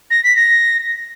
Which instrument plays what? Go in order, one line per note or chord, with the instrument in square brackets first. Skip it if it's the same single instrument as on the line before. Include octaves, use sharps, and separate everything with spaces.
[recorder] A#6
B6
A#6